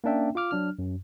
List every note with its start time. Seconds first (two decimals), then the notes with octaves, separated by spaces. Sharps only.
0.04 A#3 C#4 D4 E5 G5
0.35 F4 F5 D6 F6
0.51 F#3 D4 F6
0.79 F#2